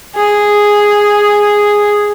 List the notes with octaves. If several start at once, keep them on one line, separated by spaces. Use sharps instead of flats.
G#4